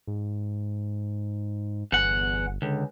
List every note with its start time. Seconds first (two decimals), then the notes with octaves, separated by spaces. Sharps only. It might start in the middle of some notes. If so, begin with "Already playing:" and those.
0.07 G#2
1.92 G1 E2 F#5
2.62 C#2 D3